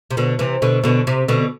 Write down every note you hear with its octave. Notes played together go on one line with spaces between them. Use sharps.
C3
B2 D3
C3 E3
B2 D3
B2 D3
C3
B2 D3